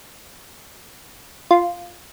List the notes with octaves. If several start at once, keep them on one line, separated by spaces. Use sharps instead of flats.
F4